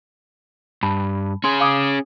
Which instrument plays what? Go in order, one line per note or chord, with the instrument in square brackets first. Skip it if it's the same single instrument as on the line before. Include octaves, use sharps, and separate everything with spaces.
[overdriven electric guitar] G2 [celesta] A5 B5
[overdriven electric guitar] C#4 G#4 [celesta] C6
[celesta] F5 D6 D#6